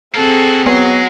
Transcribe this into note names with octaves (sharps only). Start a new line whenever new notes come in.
A#3 C4 F#4 G#4 A4
F#3 G#3 B3